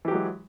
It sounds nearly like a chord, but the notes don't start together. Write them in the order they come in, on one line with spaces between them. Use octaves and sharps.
E3 G4 F#3 G#3